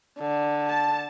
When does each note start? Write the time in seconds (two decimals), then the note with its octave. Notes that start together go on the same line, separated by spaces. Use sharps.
0.19 D3
0.70 A5